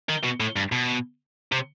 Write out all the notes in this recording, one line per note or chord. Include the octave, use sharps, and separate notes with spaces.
D#3
B2
A2
G2
B2
C3